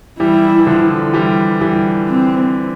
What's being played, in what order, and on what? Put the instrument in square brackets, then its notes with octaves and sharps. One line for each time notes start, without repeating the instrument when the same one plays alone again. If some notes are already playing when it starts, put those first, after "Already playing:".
[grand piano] E3 G3 [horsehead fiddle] E4
[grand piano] E3
D3 F3
E3 G3
E3 G3
[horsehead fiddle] C4